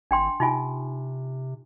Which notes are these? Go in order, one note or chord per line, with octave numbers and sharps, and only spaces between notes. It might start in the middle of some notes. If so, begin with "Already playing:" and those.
G#1 D4 G5 C6
C3 D#4 F4 G#5